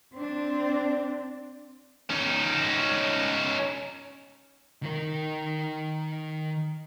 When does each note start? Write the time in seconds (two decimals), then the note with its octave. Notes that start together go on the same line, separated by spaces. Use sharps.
0.15 C4 D4
2.10 C#4 D#4
4.83 D#3 A#4